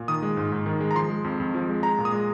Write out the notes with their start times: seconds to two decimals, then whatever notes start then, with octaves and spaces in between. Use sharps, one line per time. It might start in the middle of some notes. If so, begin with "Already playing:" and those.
Already playing: A#2
0.08 D#3 D#6
0.22 G#3
0.37 G#2
0.52 G#2
0.66 D#3
0.81 G#3
0.91 A#5
0.95 F3 C6
1.10 G#3
1.24 F2
1.40 F2
1.55 F3
1.69 G#3
1.83 G#3 A#5
1.98 A#2
2.05 D#6
2.12 G#3